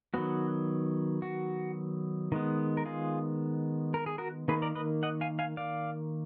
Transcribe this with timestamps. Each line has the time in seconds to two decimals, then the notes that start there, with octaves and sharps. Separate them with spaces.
0.14 D#3 F#3 B3 F#4
1.22 F#4
2.32 D#3 G#3 B3
2.77 A#4
2.85 F4 G#4
3.94 A#4
4.06 G#4
4.18 F#4 A#4
4.48 D#3 A#3 G#4 B4
4.62 A#4 D5
4.75 B4 D#5
5.03 D#5 F#5
5.21 F5 G#5
5.39 F5 G#5
5.57 D5 F5